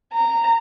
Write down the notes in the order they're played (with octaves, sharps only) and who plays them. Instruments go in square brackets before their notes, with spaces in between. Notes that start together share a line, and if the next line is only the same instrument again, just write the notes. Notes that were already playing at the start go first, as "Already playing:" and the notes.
[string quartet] A#5